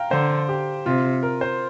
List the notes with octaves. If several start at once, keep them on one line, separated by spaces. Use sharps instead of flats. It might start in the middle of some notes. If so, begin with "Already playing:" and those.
Already playing: F5 G5 A#5
D3 C5
G4
C3 F4
A#4
C5